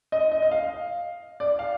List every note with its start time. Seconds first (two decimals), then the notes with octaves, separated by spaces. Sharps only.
0.12 D#5
0.32 D#5
0.42 D#5
0.51 F5
1.40 D5
1.59 F5